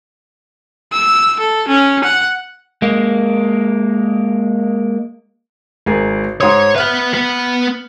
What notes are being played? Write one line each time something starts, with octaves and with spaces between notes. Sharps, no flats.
E6
A4
C#4
F#5
G#3 A#3
G#1 G#4 A#4
G#2 C#5 C6 D#6
B4 E5 F#5 F6 F#6
B3 F#5